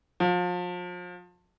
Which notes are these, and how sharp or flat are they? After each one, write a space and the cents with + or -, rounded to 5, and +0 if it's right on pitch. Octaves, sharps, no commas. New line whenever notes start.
F3 +35